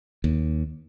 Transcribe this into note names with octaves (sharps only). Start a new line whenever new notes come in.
D#2